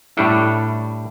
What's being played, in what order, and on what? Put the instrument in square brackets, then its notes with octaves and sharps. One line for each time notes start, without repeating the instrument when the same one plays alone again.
[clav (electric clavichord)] A2 G3 D4 A4 [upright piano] E4